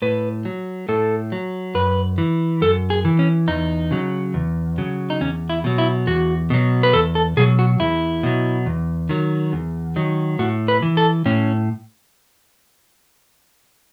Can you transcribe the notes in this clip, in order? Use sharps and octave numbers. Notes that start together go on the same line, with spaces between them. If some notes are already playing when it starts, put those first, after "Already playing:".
A2 B4
F#3
A2 A4
F#3
F#2 B4
E3
F#2 A4
G#4
E3
C#4
E2 D#4
C#3 F#3
E2
C#3 F#3
D#4
E2 C#4
E4
B2 F#3
E4
E2 F#4
B2 F#3
B4
E2 A4
A4
B2 F#3 G#4
F#4
E2 E4
B2 F#3
E2
D#3 F#3
E2
D#3 F#3
A2 F#4
B4
E3
A4
A2 C#4